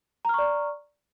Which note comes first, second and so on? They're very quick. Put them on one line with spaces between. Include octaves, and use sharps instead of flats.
A#5 F6 C#6 D5